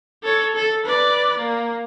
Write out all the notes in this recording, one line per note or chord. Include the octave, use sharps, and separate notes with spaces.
A4 C#5
A4
B4 D5
A#3